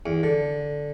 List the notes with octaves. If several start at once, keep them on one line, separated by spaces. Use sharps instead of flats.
E2
D3